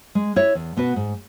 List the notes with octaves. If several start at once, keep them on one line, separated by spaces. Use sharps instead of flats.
G#3
E4 C#5 E5
E2
B2 B3 F#4 B4
G#2